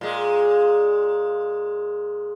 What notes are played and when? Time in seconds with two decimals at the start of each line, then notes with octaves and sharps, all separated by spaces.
0.01 A#2 G#3